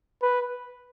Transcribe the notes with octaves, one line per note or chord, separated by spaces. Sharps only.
B4